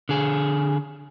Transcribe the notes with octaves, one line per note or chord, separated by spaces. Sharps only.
D3 G#4